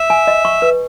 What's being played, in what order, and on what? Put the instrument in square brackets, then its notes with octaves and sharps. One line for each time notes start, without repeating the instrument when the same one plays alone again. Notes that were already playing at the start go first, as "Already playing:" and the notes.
Already playing: [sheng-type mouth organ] E5
[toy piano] G#5
D#5
C#6
B4